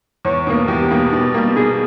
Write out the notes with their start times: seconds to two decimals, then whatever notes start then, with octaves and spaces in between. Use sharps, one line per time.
0.25 E2 C#5
0.47 B2 A#3
0.68 E2 G4
0.91 B2 A#3
1.13 B2
1.34 G3 A#3
1.56 B2 G#4